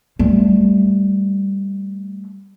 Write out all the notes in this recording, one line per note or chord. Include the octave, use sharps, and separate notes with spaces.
G3 A3